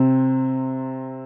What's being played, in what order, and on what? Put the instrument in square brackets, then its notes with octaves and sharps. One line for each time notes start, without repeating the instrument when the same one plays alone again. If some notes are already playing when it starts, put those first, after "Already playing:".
Already playing: [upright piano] C3 C4